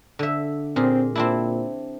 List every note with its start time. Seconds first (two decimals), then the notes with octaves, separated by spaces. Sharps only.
0.19 D3 E5
0.76 A#2 C4 G#4
1.15 A#2 C4 D4 E4